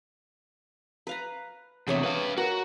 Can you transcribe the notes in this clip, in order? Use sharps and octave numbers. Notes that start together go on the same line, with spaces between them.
B4 F5 A#5
E2 C3 G#4 C#5 E5
B4 F5
F#4 A#4